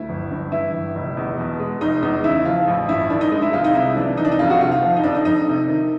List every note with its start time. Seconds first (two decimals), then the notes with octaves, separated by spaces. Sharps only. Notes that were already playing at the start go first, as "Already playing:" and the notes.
Already playing: D2 E4
0.09 G1
0.31 G2
0.52 E3 E4
0.74 G1
0.95 F1
1.17 E2
1.38 B2
1.60 G#3
1.81 F1 D#4
2.02 E2 D#4
2.24 C#3 E4
2.45 F3 F4
2.67 A1
2.89 G2 E4
3.10 D#3 D4
3.21 D#4
3.31 G#3 D#4
3.42 E4
3.53 C2 F4
3.64 D#4
3.74 C3 E4
3.96 E3 D4
4.17 C2 D#4
4.25 D4
4.31 D#4
4.39 F2 F4
4.50 F#4
4.61 C3 F4
4.72 F4
4.82 F3
4.96 D#4
5.03 F2 D4
5.14 D#4
5.25 F2 D#4
5.47 C3
5.68 D#3